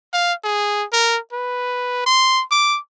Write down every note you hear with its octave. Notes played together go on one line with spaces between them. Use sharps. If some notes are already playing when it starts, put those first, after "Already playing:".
F5
G#4
A#4
B4
C6
D6